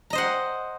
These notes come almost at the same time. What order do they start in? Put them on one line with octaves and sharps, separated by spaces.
A#5 D#5 C5 F#5